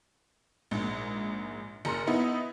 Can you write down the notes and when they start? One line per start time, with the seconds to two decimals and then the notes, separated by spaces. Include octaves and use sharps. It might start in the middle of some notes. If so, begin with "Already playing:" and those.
0.71 A#1 G#2
1.85 F#1 A#5 C6
2.07 B3 D#4 E4